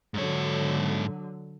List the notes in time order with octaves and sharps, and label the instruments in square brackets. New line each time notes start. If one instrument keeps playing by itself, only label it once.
[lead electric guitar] G#2 C#5 [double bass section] D3 F#3